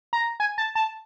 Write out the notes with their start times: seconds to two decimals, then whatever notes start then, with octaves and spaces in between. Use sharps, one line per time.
0.13 A#5
0.40 G#5
0.58 A5
0.75 A5